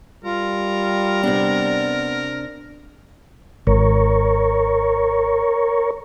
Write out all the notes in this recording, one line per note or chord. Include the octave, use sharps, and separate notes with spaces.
G3 F4 A#4
C3 B3 D4
G#1 A#4 C#5